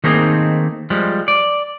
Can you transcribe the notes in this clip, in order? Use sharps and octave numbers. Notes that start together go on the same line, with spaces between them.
D#3 A3 A#3 C4 D#4 G#4
F3 G3 G#3
D5